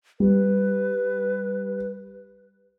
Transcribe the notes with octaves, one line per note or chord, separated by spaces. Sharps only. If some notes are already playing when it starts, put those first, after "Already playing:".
G3 B4